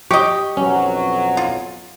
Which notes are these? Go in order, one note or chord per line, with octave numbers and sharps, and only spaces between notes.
G4 D#5 C#6
B1 F2 F#3 C#4
F4